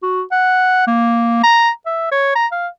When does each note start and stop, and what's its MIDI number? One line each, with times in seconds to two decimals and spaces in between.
0.03 0.22 66
0.32 0.86 78
0.87 1.42 58
1.43 1.70 82
1.86 2.08 76
2.12 2.32 73
2.35 2.47 82
2.52 2.68 77